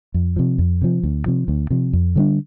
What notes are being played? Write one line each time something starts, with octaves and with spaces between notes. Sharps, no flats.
F2
C3 F3
F2
C3 F3
D2
C3 F3
D2
C3 F3
F2
D3 G3 D4